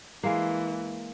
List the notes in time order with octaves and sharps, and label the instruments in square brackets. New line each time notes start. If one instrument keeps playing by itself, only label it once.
[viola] E3 [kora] G#3 A#3